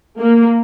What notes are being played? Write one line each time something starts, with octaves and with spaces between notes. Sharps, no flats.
A#3